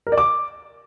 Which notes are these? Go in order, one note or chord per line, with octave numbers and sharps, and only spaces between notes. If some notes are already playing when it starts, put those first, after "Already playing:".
A#4
D5
D6